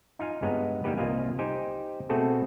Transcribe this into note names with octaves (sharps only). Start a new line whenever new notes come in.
D#4 F4 F5 G#5
G2 G#3 B3 C#5 D#5 A#5
G3 A#3 B3 D#4 G4 B4
C2 A#3 F4 D#5 F5 G#5
D#4 G4 C5 G5 G#5
B2 A3 C4 F#4 G#4 A4